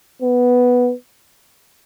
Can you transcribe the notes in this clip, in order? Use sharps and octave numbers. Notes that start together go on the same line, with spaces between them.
B3